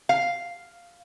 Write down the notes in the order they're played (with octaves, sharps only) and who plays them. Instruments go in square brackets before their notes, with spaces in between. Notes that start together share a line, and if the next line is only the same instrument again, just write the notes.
[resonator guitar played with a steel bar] F5